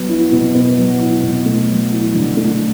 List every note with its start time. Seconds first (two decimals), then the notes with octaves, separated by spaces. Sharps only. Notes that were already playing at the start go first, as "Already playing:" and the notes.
Already playing: F#3 B3
0.09 E4
0.32 B2
0.55 B3
0.78 F#3
1.00 E4
1.22 B2
1.46 A3
1.69 F#3
1.91 E4
2.15 D3
2.37 A3